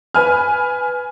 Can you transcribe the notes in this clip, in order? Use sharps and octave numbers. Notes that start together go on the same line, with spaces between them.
B4 G#5 F6